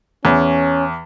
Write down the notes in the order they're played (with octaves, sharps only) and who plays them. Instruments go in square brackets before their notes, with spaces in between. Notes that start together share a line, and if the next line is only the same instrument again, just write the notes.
[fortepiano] E2 [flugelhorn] C#4